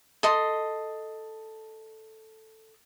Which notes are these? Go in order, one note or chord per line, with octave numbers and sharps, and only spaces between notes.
A4 D#5 C6